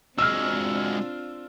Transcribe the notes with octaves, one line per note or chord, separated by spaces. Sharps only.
G#3 C4 D4 F4 F#4 E6 F6